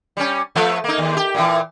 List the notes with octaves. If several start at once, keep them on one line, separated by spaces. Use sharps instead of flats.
G3 C#4
F3 A3 B3
A#3 D#4
D#2
G4
A#2 E3